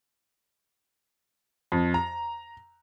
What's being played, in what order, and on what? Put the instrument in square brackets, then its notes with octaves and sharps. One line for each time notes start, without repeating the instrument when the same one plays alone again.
[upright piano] F2
A#5